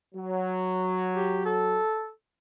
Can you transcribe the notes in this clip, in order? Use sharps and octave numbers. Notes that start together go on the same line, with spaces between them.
F#3
G4
A4